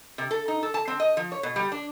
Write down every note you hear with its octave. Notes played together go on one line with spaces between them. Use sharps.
C3
A4
D#4
A4
A5
C4
D#5
F3
C#5
B2
G3
D4